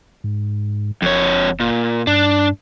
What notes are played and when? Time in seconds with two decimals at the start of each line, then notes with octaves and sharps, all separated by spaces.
0.24 G#2
1.02 F#1 F2 C#5
1.60 A#2
2.07 G2 D4